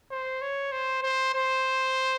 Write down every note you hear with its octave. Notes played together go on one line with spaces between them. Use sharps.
C5
C#5
C5
C5
C5